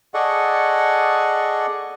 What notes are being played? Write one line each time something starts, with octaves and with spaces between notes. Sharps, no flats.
G#4 A4 D5 D#5 F#5 C#6